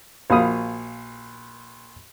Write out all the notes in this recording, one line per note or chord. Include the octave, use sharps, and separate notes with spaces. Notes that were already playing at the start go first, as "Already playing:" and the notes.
A#1 F#4 F5 B5 D#6